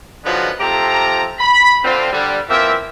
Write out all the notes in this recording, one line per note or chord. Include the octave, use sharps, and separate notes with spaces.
D3 D#3 F3 F#3 G#3 B3
C3 F3 G4 A4 A#5
B5
D3 C4 F4
D3 G3
E3 F3 A#3 C4 E5